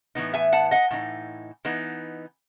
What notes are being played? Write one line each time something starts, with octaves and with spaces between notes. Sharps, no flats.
A2 E3 B3 D#4
E5 G#5
F#5 A5
D#5 F#5
A2 E3 D#4
E3 B3 D#4